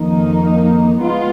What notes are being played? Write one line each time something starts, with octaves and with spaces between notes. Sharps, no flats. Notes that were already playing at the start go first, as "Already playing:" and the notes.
Already playing: F2 D#3 A#3 D#4
G#3 B3 F4